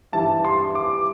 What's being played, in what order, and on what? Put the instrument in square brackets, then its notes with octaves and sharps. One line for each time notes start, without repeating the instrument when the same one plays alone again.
[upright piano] G2 E3 A5
C6
D6